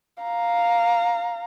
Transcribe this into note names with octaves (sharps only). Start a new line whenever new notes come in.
F5 A#5